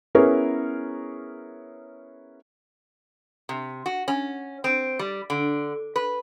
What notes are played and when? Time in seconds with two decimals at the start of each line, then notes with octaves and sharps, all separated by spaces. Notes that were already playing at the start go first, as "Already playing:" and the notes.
0.15 B3 C#4 E4 G#4 A#4 C#5
3.49 C3
3.86 F#4
4.08 C#4
4.64 C4
4.99 G3
5.30 D3
5.96 B4